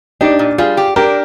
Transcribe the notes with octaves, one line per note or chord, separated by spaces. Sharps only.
D4 D#4 G4
A#2
G3 F4 G#4
G4
D4 G4 A#4